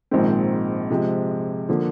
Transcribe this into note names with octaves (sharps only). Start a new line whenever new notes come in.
A#1 G#2 D#3 G#3 C4
C3 F3 G#3
D3 F3 A#3